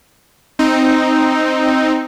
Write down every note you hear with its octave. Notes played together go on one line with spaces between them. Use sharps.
C4 D#4